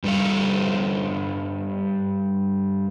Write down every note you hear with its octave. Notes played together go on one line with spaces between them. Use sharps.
G2 G3 A4 F5